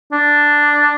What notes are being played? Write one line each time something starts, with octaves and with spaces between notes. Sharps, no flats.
D4